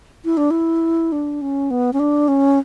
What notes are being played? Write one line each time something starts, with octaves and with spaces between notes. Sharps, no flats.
E4
D4
E4
D4
C#4
B3
C#4
D4
C#4